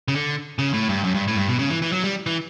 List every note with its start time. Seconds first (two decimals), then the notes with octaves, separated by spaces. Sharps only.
0.08 C#3
0.15 D3
0.59 C#3
0.74 A2
0.89 G2
1.04 F#2
1.14 G2
1.28 A2
1.37 G2
1.48 B2
1.59 C#3
1.70 E3
1.82 E3
1.92 F#3
2.04 G3
2.26 E3